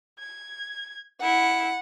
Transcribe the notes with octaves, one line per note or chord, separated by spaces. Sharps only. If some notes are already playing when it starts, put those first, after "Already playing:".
G#6
E4 F#5